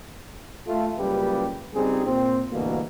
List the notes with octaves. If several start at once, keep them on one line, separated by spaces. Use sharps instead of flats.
A3 F4
C#2 F#2 G3 A#3 G4 B4
C#2 G3 C4 D#4 G#4
A#2 C4
D2 G2 B2 E3 A#3